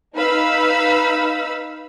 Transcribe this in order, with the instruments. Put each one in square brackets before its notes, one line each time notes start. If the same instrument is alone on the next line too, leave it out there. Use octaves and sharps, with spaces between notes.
[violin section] D#4 B4 F5 B5 E6